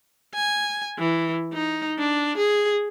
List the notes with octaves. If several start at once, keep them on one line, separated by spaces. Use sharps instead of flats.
G#5
E3
D#4
D4
G#4